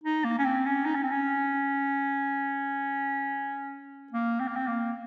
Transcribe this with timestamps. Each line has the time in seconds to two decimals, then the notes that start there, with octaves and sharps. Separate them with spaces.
0.04 D#4
0.24 A#3
0.38 C#4
0.45 C4
0.66 C#4
0.85 D#4
0.95 C#4
1.03 C4
1.11 C#4
4.12 A#3
4.40 C4
4.48 A#3
4.56 C4
4.68 A#3